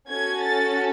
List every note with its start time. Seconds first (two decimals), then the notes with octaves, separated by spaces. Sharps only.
0.09 C#4 F#4 A4 G#6
0.42 A6